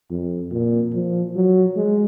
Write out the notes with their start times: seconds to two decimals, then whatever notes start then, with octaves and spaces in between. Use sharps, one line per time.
0.10 F2
0.51 A#2
0.93 F3
1.36 F#3
1.76 G#3